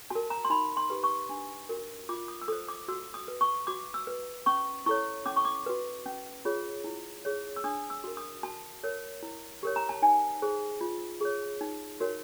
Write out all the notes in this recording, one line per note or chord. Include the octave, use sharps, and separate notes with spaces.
F#4 A#4 A5
A#5
C6
D#4 B5
C6
G4 B4
C#6
D4
F#4 A#4
F4 D6
D#6
E6
A4 C5 D#6
D6
F#4 E6
D#6
B4
C#6
F#4 D6
E6
B4
C#4 C#6
E4 A4 C#5 C#6
C#4 D6
C#6
D6
F#4 B4
C#4
F4 G#4 C#5
E4
G#4 C#5
E6
D4 D#6
E6
F#4 A#4
D#6
F#4 A5
A#4 C#5
E4
G4 A#4 C#5
A#5
A5
D#4 G#5
G#4 C5
F4
G#4 C#5
D#4
F#4 A#4 C#5